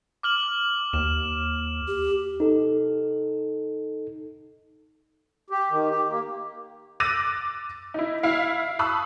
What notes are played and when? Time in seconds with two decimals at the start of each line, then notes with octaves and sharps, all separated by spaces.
0.23 D6 F6 F#7
0.93 D#2 E7
1.88 G4
2.40 D#4 A4
5.50 G4
5.70 D#3
5.89 G4
6.09 A#3
7.00 D6 E6 F#6 A6 A#6 D#7
7.94 D#4 E4
8.23 E4 F5
8.79 A5 B5 C#6 D#6 E6 F#6